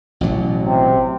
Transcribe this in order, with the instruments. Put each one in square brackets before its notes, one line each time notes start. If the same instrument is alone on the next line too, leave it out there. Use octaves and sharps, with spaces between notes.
[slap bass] A1 B2 F#3
[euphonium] C3